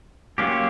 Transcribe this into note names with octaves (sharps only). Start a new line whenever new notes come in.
F#3 A#3 C#4 F4 G4